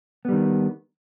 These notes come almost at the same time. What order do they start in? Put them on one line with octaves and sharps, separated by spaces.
B3 G3 D#3